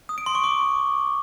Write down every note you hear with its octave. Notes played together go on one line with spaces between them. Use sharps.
D#6
D7
C6
C#6
D6